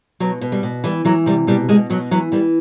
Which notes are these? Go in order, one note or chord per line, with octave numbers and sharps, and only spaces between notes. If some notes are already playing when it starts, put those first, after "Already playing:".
B2 F#3
B2
G3
B2
E3 G3
E3 F#3
C3 G3
B2 G3
B2 G#3
B2 F#3
E3 F#3
E3 G3